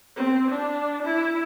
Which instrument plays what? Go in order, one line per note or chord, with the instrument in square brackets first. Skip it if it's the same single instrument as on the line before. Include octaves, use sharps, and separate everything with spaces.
[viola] C4
D4
E4